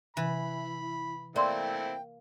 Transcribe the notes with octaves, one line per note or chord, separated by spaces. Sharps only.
C3 E3 E4 B5
A3 A#3 C4 E4 D5 E5 G5 C6